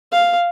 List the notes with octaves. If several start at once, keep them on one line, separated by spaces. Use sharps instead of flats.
F5